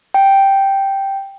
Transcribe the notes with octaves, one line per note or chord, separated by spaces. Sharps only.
G5